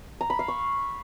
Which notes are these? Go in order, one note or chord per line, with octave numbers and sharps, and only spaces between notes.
A#5
B5
F5
C#6